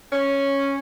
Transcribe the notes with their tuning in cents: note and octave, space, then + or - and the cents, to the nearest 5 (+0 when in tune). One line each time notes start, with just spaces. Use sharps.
C#4 -5